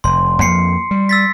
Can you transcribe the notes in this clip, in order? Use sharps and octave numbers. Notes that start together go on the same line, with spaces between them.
F1 C6
F2 F3 A#3 C7 C#7
G3
E6 A6 B6